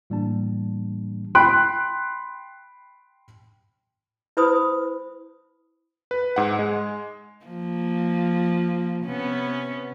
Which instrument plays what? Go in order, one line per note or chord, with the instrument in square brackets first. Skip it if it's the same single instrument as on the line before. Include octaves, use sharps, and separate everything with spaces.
[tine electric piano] A2 E3 G3 A#3 D4 A5
[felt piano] G5 B5 C6 F#6 D7
[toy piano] E4 B4 C5 B5 D#6
[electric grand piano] B4
G#2 F#5
G#3
[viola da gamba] F3 A#3
C3 B3 C#4